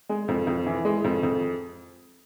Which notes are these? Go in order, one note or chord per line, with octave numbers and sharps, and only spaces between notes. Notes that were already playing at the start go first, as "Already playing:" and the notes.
G#3
F2
F2
E3
G#3
F2
F2